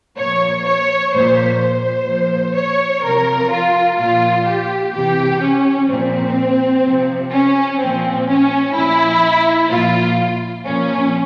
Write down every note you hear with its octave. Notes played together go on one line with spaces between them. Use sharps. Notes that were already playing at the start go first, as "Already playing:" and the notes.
A#2 F3 C#5
C#5
A#2 F3 C5
C5
A#2 F3
C#5
C3 F3 A#4
F4
A#2 F3 F4
G4
C3 E3 G4
C#4
A#2 F3 C4
C3 F3
C#4
A#2 F3 C4
C#4
A#2 F3 E4
A#2 F3 F4
A#2 F3 C#4